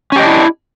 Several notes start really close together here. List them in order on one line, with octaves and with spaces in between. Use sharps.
C#4 G4 D#5 D4 E4